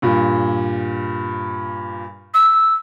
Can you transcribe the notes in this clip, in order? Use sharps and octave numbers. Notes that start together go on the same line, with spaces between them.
G2 A#2
E6